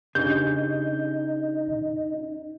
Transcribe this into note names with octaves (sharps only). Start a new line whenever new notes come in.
C#3 D4 D#4 G4 G6